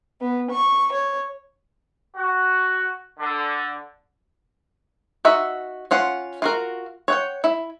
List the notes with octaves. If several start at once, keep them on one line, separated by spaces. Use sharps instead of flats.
B3
C#6
C#5
F#4
D3
D#4 F#4 E5
C#4 F4 F#5
F4 F#4 A#4
C#5 F#5 G5
E4